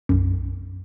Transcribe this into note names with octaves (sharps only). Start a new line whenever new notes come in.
B1 F#2